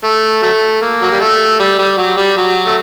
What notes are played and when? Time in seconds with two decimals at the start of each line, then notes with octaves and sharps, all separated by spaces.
0.04 A3
0.42 F#3 A3
0.81 A#3
1.02 F#3
1.11 G3
1.20 A3
1.60 G3
1.79 G3
1.98 F#3
2.17 G3
2.37 F#3
2.66 A3